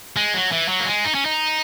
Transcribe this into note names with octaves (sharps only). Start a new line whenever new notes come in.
G#3
F#3
E3
F#3
A#3
G#3
D#4
C#4
D#4